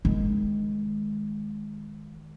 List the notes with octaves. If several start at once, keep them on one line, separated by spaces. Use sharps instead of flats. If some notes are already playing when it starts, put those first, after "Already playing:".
D#3 G#3